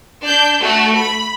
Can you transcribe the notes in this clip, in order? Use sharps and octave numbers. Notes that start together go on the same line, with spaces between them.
D4 G6
A3 F#4
B5